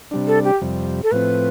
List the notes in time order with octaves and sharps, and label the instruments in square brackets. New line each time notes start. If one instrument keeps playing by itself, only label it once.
[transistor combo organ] C3 G3 D4
[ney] A4
G4
[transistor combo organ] F2 C3 G3
[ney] A4
[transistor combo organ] A2 F3 C4 [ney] B4